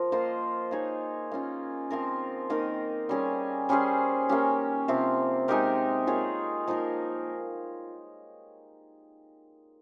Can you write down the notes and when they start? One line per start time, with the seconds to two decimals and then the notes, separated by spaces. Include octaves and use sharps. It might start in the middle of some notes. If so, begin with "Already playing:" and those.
Already playing: F3 A#4
0.12 A#3 F4 C5 D#5
0.71 A#3 D#4 G#4 C#5
1.32 A#3 C#4 F4
1.90 F3 C4 F4 A#4
2.50 D#3 A#3 D#4 A#4
3.09 G3 C#4 G#4 C#5
3.69 G3 C#4 G#4 C5
4.29 A#3 C#4 G4
4.88 C3 F3 C4
5.48 G#3 D#4 G4 A#4
6.07 A#3 F4 G#4 C#5
6.68 F3 A#3 D#4 A#4